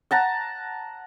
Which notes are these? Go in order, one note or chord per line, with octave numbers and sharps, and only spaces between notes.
F#5 A5 A#5